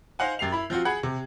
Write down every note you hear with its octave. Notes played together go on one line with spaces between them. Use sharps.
D#4 C5 D#5 F5 F#5 G#5
F#2 G4 C7 F7
E4 B5
F3 C4 F4 F#4
G#4 F#5 B5 G#6
C3